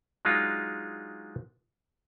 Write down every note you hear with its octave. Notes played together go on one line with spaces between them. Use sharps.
F#3 G#3 D4 D#4 F4